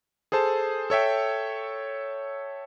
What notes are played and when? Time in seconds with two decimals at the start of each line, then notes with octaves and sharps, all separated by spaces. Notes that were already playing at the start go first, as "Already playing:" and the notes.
0.32 G#4 A4 C5 A5
0.90 A4 C#5 E5 G5